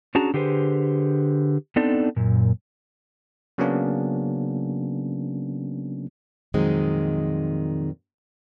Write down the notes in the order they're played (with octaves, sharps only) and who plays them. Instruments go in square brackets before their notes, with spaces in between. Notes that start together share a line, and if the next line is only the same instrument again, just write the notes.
[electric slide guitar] C#4 D4 F#4 G#4 A5 A#5
D3 G4 G#4 B4 C5
B3 C4 D4 D#4 A4 D5
F#2 A#2
[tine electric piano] C#3 F#3 A#3 B3 C#4 D4
[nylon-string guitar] F2 A#2 D#3 F#3 G#3 C4